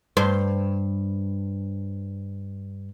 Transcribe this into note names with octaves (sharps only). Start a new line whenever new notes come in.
G2 C5